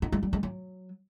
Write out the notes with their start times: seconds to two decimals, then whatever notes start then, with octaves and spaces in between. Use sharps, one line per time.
0.02 D#4
0.12 G#3
0.23 G3
0.33 G#3
0.43 F#3